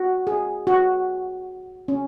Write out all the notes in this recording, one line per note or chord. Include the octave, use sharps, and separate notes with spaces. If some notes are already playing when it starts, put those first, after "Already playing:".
Already playing: F#4
G#4
F#4
C#4